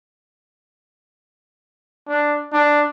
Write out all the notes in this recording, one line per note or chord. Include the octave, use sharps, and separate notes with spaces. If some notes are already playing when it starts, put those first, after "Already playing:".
D4
D4